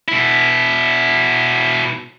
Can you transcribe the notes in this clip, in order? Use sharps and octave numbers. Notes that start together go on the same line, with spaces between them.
B2 E4